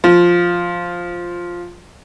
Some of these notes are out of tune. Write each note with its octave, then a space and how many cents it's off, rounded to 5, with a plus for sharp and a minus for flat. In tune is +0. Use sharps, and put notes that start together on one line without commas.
F3 +5